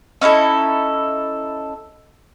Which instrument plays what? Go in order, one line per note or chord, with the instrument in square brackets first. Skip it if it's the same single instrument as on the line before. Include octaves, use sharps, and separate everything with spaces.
[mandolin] C#4 D#4 E4 A4